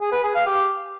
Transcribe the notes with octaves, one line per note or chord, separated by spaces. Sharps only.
G#4
B4
G#4
F5
G4